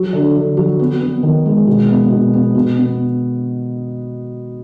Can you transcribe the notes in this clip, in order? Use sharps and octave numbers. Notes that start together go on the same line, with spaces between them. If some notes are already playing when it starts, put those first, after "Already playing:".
Already playing: F#3
D3
D3
F#3
B3
B3
D#3
G#3
B2
B3
B2
B3
B2
B3